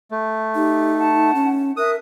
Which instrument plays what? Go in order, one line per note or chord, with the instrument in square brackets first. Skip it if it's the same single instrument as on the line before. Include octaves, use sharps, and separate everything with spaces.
[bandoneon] A3
[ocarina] D#4 [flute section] G4
[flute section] F#5 A5
[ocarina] C#4
[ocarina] A#4 [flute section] E5 F#6 [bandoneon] D#6